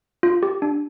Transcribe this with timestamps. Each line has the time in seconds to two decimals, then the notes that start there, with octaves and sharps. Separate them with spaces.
0.23 F4
0.43 G4
0.62 D4